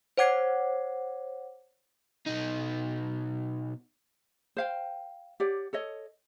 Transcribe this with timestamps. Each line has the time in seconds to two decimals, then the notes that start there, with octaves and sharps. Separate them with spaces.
0.17 C5 C#5 F#5 D6 G#6 C7
2.27 B2 D#4
4.57 C5 F5 G5
5.40 G4 C#5 D5 F#5
5.73 A4 C#5 D#5